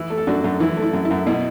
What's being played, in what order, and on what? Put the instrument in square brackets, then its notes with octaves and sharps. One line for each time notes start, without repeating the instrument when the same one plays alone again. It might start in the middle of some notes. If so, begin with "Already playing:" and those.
Already playing: [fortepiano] E3 E4
A3
A4
F#2 D4 F#4
F#2
E3 E4
A3
E4
F#2
E4
F#2
B2 E4